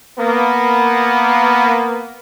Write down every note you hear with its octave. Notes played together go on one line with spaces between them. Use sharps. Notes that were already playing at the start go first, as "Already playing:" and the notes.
A#3 B3